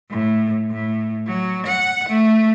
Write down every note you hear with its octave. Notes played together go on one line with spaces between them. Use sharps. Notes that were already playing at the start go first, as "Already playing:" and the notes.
A2
A2
F#3
F#5
A3